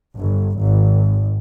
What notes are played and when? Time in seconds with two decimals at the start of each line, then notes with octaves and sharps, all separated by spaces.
0.19 G1
0.60 G#1